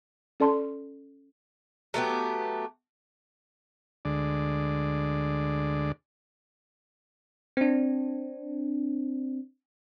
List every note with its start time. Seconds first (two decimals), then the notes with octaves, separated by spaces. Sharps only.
0.40 C#4 A4 D5 A5 C6
1.94 F#3 A3 B3 G4
4.05 D2 D3 G#3 D5
7.57 C4 D4